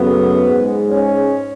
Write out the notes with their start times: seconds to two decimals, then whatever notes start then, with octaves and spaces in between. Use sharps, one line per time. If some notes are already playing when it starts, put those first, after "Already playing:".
Already playing: F#2 C#3 F#3 A3 B3
0.42 G#2 G#3
0.89 C#4